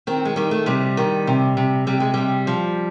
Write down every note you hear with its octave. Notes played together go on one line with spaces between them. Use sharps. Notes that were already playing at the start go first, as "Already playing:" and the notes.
D#3 C4
G#3
D#3 G3
A3
C3 G3
D#3
C3
C3
C3 G3
G#3
C3 G3
F3